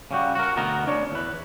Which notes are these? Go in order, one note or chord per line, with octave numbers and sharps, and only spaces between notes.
C#3 G3 F#4
F#4 A#4
D2 B2 B3 A#4 A#5
D4 C#5
E2 B4